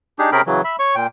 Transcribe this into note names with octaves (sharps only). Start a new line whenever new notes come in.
D4 D#4 G4 G#4
C3 C#4 G#4 A#4 G5 B5
C#3 E3 F#3
E5 B5
C#5 C#6
A#2 G5